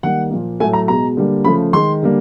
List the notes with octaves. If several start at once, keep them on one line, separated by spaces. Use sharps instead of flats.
D#3 G3 A#3 F#5
A#2 F3 A#3
A2 F#3 A3 G#5
A#5
B2 G#3 A#5
D3 G3 A#3
C#3 F3 A3 B5
D#3 G#3 C6
D3 G3 A#3